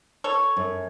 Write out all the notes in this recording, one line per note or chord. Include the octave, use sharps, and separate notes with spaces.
A4 C#5
F#2